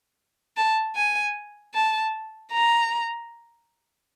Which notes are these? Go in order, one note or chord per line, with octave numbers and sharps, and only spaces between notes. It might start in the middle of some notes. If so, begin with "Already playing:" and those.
A5
G#5
A5
A#5